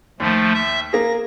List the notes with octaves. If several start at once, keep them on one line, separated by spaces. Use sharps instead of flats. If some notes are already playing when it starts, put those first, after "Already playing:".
D#2 F3 A3
E5
A#3 G#4 A#6